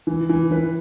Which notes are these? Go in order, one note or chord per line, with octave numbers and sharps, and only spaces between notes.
E3
E3
E3 B4